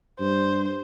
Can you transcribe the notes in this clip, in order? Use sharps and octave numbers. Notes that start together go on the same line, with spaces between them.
G2 C5